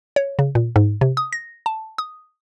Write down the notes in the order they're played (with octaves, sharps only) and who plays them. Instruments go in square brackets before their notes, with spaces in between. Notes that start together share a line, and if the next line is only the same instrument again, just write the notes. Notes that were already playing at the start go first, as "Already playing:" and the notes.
[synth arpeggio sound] C#5
C#3
A#2
G#2
C3
D#6
A#6
A5
D#6